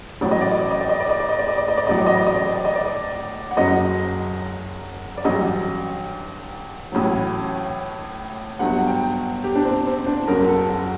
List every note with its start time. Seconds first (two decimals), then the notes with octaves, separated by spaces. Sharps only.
0.21 A1 A2 F#3 D5
0.31 D#5
0.41 D5
0.51 D#5
0.61 D5
0.71 D#5
0.80 D5
0.89 D#5
1.00 D5
1.09 D#5
1.19 D5
1.29 D#5
1.39 D5
1.48 D#5
1.58 D5
1.68 D#5
1.77 D5
1.87 A1 A2 F#3 D#5
1.98 D5
2.06 D#5
2.17 D5
2.26 D#5
2.36 D5
2.45 D#5
2.55 D5
2.65 D#5
2.75 D5
3.51 F#5
3.57 F#1 F#2 F#3 D#5
5.17 D5
5.24 A1 G2 F#3 D#5
6.92 A1 A2 F#3
8.59 G1 G2 F#3 F#5
8.87 G5
9.44 G4
9.55 D4
9.65 C4
9.86 C4
10.06 D4
10.27 F#1 F#2 F#3 A#4
10.48 A4
10.69 F#4